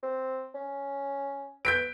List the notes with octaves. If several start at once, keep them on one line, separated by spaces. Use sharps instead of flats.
C4
C#4
B4 G6 B6 D7